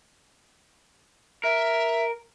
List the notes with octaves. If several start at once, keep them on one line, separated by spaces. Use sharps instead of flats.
A#4 E5